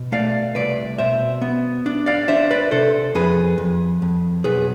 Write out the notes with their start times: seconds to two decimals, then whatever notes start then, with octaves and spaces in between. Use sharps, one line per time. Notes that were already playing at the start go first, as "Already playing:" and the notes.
Already playing: B2
0.12 A3 D5 F5
0.55 C2 B4 D5
0.98 B2 C5 E5
1.41 B3
1.86 D4
2.06 D5 F5
2.28 D4 C5 E5
2.51 B4 D5
2.71 C3 A4 C5
3.15 F2 G#4 B4
3.58 F2
4.02 F2
4.44 B1 G#4 B4